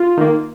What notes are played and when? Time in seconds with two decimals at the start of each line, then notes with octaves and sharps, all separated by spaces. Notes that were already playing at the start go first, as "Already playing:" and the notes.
Already playing: F4
0.17 D#3 A#3